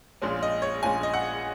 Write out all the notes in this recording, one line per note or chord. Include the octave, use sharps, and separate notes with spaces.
A#1 A#2 G#3 C#4
D#5
C#5
A#1 A#2 G#3 C#4 G#5
D#5
F#5